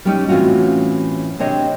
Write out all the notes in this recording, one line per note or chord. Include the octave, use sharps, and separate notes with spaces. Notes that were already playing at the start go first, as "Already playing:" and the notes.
G3 C#4 D#4
A2 E3 C4 C#4 F4 F#4
C3 C4 D4 C#5 D#5